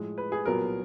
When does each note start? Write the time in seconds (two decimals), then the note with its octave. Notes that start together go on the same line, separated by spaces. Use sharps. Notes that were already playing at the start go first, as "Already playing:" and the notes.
Already playing: A2 F3 G#3
0.18 B4
0.32 G#4
0.45 C2 A#2 F#3 B3 A#4